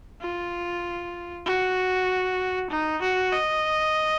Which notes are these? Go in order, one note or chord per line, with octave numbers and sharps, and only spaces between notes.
F4
F#4
D#4
F#4
D#5